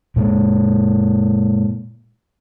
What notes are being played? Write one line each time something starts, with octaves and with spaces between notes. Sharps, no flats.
A#2 G#3 A#3